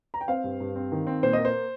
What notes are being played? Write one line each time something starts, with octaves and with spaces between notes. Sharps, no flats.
A#5
G5
C4 C5 F5
G2
G2
C4
D#3
C4
A#2 C5
A#3 D#5
C5